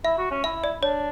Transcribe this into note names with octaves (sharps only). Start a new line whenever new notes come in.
E4 E5
F#4
C#4
E4 E5
D5
D4 C#5